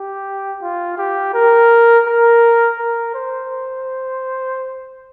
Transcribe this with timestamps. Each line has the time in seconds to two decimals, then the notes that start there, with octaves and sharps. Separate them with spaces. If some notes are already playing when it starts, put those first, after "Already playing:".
Already playing: G4
0.62 F4
0.98 G4
1.34 A#4
2.07 A#4
2.79 A#4
3.15 C5